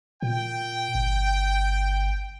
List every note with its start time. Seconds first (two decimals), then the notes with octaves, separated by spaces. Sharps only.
0.23 A#2 G5
0.95 G1